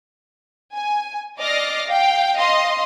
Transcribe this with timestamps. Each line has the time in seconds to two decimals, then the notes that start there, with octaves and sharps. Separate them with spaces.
0.74 G#5
1.39 D5 D#5 D6 F6 A#6 C7
1.87 F5 G5
2.36 D#5 F5 C6